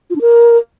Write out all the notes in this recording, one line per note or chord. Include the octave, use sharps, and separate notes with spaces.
F4
D4
A#4